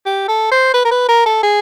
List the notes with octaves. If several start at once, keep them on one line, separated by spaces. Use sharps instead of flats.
G4
A4
C5
B4
A#4
B4
A#4
A4
G#4